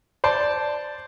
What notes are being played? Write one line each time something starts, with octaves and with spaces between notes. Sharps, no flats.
C5 D5 A5